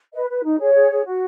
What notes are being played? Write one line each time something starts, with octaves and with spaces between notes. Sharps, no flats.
B4 D#5
B4
D#4
G#4 C#5
G#4
G#4
F#4